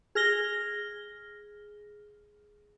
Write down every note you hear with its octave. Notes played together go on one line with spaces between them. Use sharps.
G#4 F6 A#6 G7